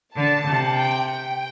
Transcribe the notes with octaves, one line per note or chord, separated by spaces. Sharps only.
D3 A5
C3
G5
G5